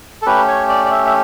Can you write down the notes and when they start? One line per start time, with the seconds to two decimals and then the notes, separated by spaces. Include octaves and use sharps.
0.22 A4
0.26 A3 C#4 G4 B4
0.48 C#5
0.69 D5
0.85 D5
0.91 E5
1.06 E5